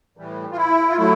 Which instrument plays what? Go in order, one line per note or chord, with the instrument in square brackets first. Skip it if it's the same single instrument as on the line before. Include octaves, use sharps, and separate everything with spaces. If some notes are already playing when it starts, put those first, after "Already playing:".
[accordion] A2 E3 G3
F4
E4
F4
F#3 A3 E4